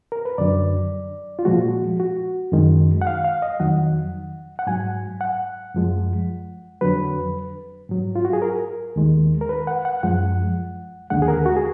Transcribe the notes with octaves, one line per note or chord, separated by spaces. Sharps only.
A#4
B4
F#2 D3 F#3 D5
F4
A#2 F3 G#3 F#4
F#4
F#2 D#3 G#3
F#5
F5
F5
D#5
F2 D#3 F#3 F#5
F#5
G#2 F#3 G#5
F#5
F#2 F3 G#3
F2 D3 F#3 B4
G#2 F#3
F4
F#4
G#4
A#4
D#2 D#3 G#3
A#4
B4
F#5
F#5
F#2 F3 G#3 F#5
D#2 D3 G#3 F#5
G#4
A#4
F#4
G#4